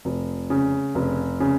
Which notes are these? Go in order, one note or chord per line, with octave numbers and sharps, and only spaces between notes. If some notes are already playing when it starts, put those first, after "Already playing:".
F1
C#3
F1
C#3